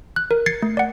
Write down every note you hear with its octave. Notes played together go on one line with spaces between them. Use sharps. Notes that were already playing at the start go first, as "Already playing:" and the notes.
F#6
A#4
G#6 A6 C7 C#7
A3
D5 F#5